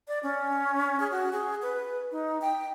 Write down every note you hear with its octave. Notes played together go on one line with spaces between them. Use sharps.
D5
C#4
G#4
F#4
G#4
B4
D#4
G5